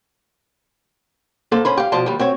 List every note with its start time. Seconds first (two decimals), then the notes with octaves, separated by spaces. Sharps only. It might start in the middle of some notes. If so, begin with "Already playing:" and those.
1.52 A#3 A4 C5
1.65 G#2 C#4 C5 B5
1.77 G4 F5
1.92 B2 F3 C5 D5 A5
2.06 D#2 G3
2.19 C4 F#4 C#5